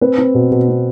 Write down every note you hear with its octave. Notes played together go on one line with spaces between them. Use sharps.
C4 B4
C4
B2
B2
C4